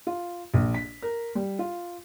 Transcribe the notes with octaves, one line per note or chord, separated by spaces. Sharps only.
F4
A#1
B6
A#4
G3
F4